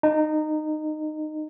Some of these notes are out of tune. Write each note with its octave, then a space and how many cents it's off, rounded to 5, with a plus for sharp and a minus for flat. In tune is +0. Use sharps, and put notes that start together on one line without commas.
D#4 -20